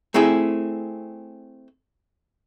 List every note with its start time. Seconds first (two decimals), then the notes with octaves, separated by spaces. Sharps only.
0.14 A3 C4 E4 G#4